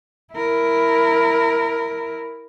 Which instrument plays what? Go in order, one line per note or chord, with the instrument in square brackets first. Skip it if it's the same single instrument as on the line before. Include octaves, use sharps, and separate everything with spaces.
[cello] E4 A#4